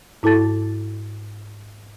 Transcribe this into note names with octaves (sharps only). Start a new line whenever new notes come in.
G#2 E4 A4 A5 A6